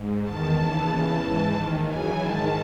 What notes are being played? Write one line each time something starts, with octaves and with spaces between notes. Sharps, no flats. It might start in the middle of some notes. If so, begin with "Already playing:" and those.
Already playing: G#2
E2 D#3 A5
D#2 C#3 E3
E2 C#3 E3 A5
G#2 E3
D#2 D#3
F#2 C#3 E3 G#5
G#2 D#3 A5